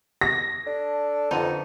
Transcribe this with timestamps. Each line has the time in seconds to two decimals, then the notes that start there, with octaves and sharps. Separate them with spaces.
0.21 A#6
0.67 D4 A4
1.31 F2 D3 B3 D#4